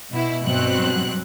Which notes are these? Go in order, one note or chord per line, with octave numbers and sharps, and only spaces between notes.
B2 E4
G2 B2 F#3 C4 F#6